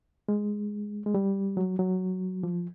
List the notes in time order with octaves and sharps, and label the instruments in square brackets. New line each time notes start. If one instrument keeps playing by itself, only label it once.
[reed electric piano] G#3
G#3
G3
F#3
F#3
F3